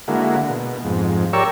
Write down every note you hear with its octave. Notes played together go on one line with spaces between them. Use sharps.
D3 G#3 A#3 E4 F#4
B2
F2 G#2
G4 A#4 C#5 D5 C#6 E6